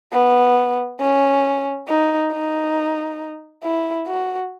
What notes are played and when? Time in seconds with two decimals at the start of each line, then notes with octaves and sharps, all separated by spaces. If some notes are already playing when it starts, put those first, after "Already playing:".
0.13 B3
1.00 C#4
1.88 D#4
2.32 D#4
3.63 E4
4.07 F#4